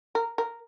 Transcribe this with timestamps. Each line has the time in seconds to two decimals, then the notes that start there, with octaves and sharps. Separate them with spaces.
0.15 A#4
0.38 A#4